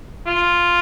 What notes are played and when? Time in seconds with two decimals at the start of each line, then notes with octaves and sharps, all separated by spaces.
0.26 F4